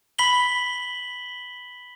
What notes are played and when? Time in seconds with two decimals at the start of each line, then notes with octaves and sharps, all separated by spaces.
0.18 B5 B6 F#7 G7